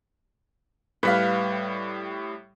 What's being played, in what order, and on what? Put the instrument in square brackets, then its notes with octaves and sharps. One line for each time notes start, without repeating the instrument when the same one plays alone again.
[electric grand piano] A2 G3 [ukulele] B4 F5